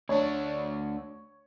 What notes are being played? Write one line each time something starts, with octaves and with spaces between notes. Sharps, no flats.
D2 D4 C#5